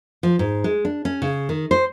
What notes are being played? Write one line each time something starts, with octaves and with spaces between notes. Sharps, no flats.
F3
G#2
G#3
D4
C#4
C#3
D#3
C5